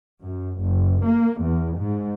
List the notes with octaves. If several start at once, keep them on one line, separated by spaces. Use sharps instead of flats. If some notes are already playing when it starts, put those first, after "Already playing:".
F#2
F#1
A#3
E2
G#2